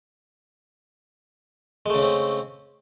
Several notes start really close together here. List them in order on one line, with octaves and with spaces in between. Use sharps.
G#3 A3 C#3 C#4 C4